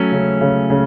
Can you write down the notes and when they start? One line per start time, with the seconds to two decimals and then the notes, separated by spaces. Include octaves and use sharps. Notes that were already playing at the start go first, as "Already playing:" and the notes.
Already playing: F#3 A3 C#4
0.12 C#3
0.41 C#3
0.70 C#3